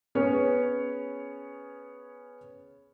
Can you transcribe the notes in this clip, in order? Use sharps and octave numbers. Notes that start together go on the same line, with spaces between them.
B3 C#4 G#4 C#5